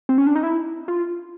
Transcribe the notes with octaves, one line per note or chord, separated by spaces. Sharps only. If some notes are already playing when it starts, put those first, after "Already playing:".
C4
C#4
D4
D#4
E4
F4